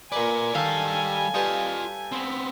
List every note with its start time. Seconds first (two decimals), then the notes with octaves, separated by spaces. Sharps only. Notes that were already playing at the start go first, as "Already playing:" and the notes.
0.12 A#2 A#4 B4 D5 G#5
0.54 D#3 G3 A4 F5 A5
1.34 G3 F4 B4 D#5 A5
2.12 B3 C4